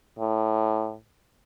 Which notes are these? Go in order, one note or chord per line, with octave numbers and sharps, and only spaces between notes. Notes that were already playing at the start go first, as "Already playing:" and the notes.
A2